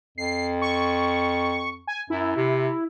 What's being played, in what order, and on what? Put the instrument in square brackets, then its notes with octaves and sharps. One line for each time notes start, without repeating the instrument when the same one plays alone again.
[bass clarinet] F2 [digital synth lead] C7
[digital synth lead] C#6
G#5
[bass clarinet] F#2 [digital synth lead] E4
[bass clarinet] C3